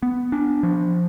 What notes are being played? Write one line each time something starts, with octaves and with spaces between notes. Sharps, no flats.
B3
D4
F3